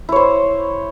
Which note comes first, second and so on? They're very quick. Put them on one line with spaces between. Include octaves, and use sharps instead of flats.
E4 C#5 C5